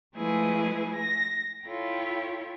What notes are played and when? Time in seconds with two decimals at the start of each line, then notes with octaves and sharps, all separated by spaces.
0.16 F3 G#3 A3 E4 G#4 B4
0.96 A#6
1.66 E4 F4 A4 C#5 G5